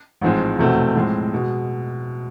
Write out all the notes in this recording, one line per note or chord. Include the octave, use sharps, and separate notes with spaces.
A1 G#2 F3 G#3 C4
F1 E2 B2 A3 C4
A2 F3 G#3 C4
B2 G#3